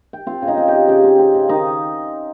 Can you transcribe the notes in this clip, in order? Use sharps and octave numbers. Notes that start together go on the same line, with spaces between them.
G5
C4 F4 F5
C#3
D#4 D#5
C4
C#3 G4 G5
C#3 G4 G5
C4
C4
C#3
D#3 D#4 D#5